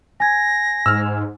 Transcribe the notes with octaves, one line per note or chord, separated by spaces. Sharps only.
G#5 G#6 A#6
G#2 E6 F6